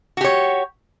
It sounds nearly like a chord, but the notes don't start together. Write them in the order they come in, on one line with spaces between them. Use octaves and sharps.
F#4 G4 C#5